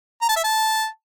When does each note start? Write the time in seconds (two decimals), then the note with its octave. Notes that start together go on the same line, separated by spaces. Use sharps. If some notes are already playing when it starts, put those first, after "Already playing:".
0.22 A#5
0.29 A5
0.36 E5
0.44 A5